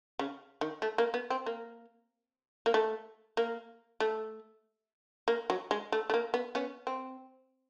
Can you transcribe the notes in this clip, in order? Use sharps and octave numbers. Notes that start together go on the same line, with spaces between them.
C#3
D#3
A3
A#3
B3
C4
A#3
A#3
A3
A#3
A3
A#3
F#3
G#3
A3
A3
A#3
B3
B3 C#4
C4